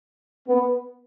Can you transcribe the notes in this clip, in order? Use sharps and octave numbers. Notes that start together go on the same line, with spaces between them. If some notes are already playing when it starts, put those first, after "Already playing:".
B3